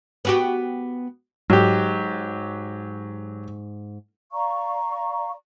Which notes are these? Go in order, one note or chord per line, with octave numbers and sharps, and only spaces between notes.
B3 F#4 G4
G#2 F#3 G4
D5 F5 A#5 C#6